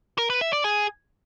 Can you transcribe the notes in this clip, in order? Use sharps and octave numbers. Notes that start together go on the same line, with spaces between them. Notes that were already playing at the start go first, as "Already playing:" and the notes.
A#4
B4
E5
D5
G#4